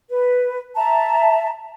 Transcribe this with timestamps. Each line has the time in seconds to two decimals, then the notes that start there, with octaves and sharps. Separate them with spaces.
0.09 B4
0.76 E5 A5 A#5